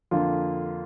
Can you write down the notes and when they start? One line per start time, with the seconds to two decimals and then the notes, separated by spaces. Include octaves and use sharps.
0.11 F2 D3 A#3 F4